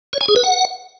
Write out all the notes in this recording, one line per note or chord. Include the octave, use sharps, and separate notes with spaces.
C#5
G#5
G#4
B4
F#5